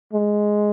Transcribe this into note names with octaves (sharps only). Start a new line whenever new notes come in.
G#3